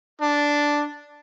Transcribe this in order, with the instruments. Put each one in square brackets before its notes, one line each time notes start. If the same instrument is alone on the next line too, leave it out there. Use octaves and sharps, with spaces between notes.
[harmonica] D4